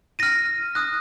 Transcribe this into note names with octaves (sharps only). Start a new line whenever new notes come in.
F6 A#6 D#7
D#6 F#6 A#6